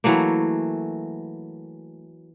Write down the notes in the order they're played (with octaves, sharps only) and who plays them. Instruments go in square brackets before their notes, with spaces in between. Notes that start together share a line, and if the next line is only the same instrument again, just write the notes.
[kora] E3 F#3 A3 A#3